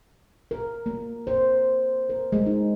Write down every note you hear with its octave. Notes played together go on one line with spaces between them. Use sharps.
A#4
A#3
C5
A#4
G#3
D#4